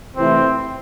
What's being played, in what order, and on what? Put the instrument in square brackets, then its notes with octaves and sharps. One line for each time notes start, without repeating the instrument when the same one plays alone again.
[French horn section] C3 E3 A3 E4 [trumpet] C4